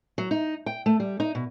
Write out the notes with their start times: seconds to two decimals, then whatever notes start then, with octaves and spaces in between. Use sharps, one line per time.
0.18 F#3
0.31 D#4
0.66 G5
0.86 A3
1.00 G3
1.20 D#4
1.35 B2